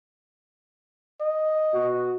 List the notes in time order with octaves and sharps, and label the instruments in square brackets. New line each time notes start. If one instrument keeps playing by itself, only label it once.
[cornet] D#5
[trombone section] B2 F#4